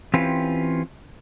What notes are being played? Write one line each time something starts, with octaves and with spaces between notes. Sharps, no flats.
E3 C4 C#4 F4 G4 B4